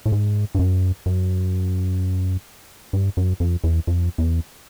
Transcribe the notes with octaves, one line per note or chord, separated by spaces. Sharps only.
A2
G#2
G2
F#2
F#2
G2
F#2
F2
E2
F2
E2